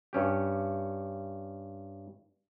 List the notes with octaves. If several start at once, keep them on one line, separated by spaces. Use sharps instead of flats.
G2 C#4 G4